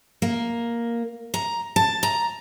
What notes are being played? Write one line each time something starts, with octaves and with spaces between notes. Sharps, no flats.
A#3
A#5
A5
A#5